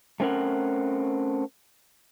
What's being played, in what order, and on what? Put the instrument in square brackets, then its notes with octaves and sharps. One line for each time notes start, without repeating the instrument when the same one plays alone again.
[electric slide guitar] A3 C4 C#4 A#4 F#5